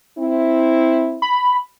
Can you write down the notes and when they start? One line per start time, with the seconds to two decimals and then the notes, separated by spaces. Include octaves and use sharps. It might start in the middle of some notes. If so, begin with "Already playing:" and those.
0.18 C4 E4
1.22 B5